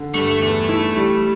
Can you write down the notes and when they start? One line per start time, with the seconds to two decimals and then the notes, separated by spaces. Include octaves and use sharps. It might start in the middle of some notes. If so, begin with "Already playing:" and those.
Already playing: D3
0.14 G2 A3
0.42 E2
0.69 E4
0.96 G3